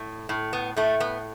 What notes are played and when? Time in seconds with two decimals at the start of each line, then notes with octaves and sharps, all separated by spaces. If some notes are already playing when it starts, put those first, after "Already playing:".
Already playing: A2
0.29 A2
0.53 B3
0.76 A2 A3
1.00 B3